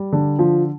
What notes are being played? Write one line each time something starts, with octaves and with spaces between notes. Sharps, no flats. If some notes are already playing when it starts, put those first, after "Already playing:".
Already playing: G3
D3
F3